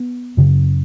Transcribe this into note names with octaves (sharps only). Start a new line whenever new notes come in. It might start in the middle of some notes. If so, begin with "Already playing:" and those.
Already playing: B3
F#2 C#3